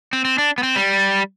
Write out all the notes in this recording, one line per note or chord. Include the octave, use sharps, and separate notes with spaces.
C4
C4
D4
B3
C4
G3